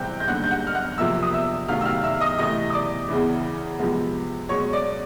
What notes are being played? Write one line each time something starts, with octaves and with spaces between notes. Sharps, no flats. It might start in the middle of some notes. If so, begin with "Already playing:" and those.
Already playing: C3 E3 G3 C4 G5 F#6 G6
G6
D#2 D3 G3 F#5 F#6
G6
F#5 F#6
F6
F#5 F#6
C3 F3 A#3 E5 E6
D#6
E5 E6
C3 D#3 F#3 A3 F5 F6
E6
F5 F6
E5 E6
D#5 D#6
C3 E3 A3 D#5 D#6
D#6
D5 D6
E2 C#3 E3
C3 F3 G#3 B3
B2 G#3 C#4 C#5 C#6
D5 D6